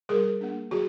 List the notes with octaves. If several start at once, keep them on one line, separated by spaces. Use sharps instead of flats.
G3 G#4 A#4
A#3 D4
F#3 F#4 G#4